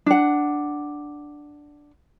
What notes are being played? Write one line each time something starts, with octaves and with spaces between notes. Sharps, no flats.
D4 F#5